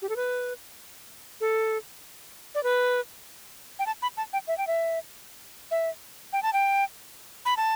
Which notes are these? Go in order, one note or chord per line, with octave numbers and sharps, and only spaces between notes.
G4
A4
B4
A4
D5
B4
G5
A5
B5
A5
G5
E5
G5
E5
E5
G5
A5
G5
B5
A5